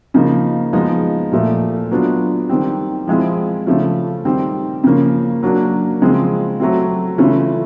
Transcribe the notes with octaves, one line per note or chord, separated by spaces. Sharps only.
C#3 F3 A#3 D#4
F3 G#3 B3 D#4
A#2 F3 A3
F#3 B3 D4 F4
D#3 G3 C4
F3 G#3 C4 E4
C#3 F3 A3 C#4
D#3 G3 C4
C#3 F3 A#3 C#4
F#3 A#3 D4
C#3 F3 G#3 C4
F#3 A3 C4
C#3 E3 A3 C#4 F4